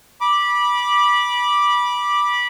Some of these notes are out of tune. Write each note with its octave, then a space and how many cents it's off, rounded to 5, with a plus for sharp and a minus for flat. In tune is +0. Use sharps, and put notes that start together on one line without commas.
B5 -20 D6 +0